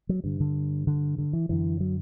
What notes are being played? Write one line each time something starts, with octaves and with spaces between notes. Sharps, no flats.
F#3
G2 D3
D3
D3
D3
E3
F#2 D3 E3
F#3